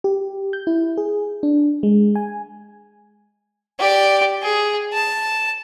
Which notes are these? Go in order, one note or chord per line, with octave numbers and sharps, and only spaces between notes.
G4
G6
E4
G#4
D4
G#3
G#5
G4 D5
G#4
A5